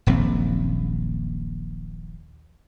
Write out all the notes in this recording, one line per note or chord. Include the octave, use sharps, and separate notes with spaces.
D#1 A#1 F#2 C4